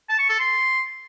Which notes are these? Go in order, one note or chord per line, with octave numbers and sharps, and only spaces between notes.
A5
C#6
A4
C6